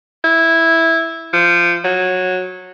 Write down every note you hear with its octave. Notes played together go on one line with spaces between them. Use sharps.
E4
F3
F#3